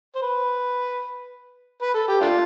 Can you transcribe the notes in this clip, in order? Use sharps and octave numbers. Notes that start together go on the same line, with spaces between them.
C5
B4
B4
A4
G4
A3 D4 F4